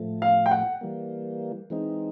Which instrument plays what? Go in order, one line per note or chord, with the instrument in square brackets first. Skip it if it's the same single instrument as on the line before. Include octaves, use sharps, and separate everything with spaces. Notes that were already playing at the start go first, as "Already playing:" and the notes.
Already playing: [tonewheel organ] A2 F3 A3
[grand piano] F5
G5
F#5
[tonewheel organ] E3 G3 A#3
E3 G#3 C4 D#4